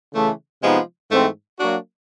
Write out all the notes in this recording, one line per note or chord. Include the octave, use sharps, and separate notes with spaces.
C#3 E3 A3
C3 F3 G#3 B3 D#4
G#2 E3 A3 C4
F#3 A#3 D4 F#4